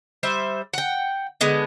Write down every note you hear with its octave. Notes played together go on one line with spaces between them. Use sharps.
G3 C5 E5
F#5 G5
D3 G#3 B3